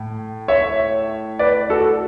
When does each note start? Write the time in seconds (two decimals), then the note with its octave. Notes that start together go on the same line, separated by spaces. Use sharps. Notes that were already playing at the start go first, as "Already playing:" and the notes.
Already playing: A2
0.48 C#5 E5
1.39 B4 D5
1.70 F#4 A4